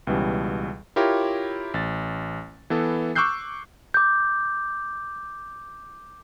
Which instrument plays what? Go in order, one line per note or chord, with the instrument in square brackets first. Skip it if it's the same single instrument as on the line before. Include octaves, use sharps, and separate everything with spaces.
[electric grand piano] C#2 B2 E3 G3 C#4
E4 F4 G4 A#4 C#5
A1 A6
E3 B3 A4
C#6 D6 E6 F#6 G6 C7
[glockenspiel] D6 G6